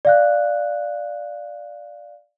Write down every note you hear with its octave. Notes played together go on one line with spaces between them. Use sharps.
D5 F5 F#6